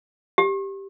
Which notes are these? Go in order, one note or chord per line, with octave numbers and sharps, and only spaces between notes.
G4